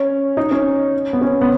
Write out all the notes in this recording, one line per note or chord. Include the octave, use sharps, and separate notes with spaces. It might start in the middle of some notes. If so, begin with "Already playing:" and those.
Already playing: C#4
D#4
C#4
B3
C#4
B3